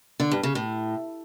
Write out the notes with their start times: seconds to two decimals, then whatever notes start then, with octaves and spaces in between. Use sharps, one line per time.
0.20 D3
0.31 G2
0.43 C#3
0.55 A2